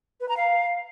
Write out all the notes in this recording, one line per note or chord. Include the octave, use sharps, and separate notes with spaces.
B4
A#5
F5